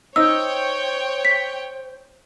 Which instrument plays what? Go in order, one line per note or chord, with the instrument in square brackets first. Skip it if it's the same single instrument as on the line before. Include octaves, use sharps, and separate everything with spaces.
[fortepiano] D#4 [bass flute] C5 [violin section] C#5 G5 [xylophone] E6
[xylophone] B6